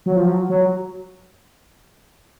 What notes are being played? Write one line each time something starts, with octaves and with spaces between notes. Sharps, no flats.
F#3
F3
F#3
F#3